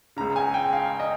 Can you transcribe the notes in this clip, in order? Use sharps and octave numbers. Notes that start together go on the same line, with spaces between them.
C#2 C#3 A#5
G#5
G5
F5
D#5